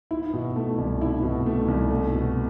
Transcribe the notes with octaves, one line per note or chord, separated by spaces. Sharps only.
E4
B2
A3
C2
E4
B2
A3
C2
A3
B2